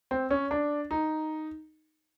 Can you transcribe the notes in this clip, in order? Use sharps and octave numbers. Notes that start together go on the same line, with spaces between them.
C4
C#4
D4
D#4